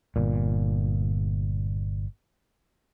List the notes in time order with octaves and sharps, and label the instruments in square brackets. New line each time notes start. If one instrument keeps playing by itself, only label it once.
[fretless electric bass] G1 A#2